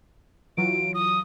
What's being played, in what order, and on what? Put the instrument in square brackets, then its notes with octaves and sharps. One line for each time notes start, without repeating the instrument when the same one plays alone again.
[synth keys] E3 F#3 F4 [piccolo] D7
[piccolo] D#6